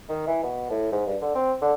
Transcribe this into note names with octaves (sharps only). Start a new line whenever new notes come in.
D#3
E3
B2
A2
G#2
G2
D3
C4
D3